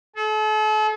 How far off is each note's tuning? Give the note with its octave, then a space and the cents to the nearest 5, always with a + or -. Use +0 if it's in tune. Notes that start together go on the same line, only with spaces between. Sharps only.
A4 -40